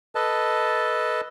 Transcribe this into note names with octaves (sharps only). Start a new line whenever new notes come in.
A4 B4 D#5 A5